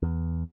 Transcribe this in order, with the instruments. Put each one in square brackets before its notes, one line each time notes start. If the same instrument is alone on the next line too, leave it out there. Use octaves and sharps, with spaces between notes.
[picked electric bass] E2